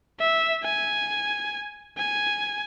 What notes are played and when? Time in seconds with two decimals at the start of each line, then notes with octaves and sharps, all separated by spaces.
0.20 E5
0.64 G#5
1.98 G#5